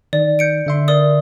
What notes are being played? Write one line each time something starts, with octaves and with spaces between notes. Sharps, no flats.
D#3 D5
G6 C#7 D7
D3 E5 C6
A#4 D5 D#6